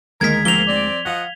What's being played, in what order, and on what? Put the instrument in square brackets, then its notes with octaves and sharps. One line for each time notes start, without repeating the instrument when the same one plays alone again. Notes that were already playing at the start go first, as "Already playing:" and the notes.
[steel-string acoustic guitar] D2 G#3 [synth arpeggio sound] D#3 A#3 D#5 [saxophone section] A#4 [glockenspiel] G#6 B6
[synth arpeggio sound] F3 [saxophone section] A#3 C4 [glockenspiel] F7 G7
[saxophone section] C4 D5
[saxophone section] F3 D#5 F#5 [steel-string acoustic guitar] F5